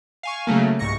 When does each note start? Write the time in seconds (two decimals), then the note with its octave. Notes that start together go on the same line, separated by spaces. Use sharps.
0.23 F5 G#5 C#6
0.47 C#3 F#3 A3 A#3
0.79 C2 G#2 C#6 A#6 C#7